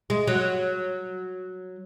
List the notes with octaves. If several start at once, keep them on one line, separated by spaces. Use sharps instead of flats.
G#3
F#3